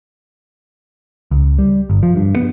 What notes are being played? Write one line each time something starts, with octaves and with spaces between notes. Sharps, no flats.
C#2
G3
G1
F3
G2
B3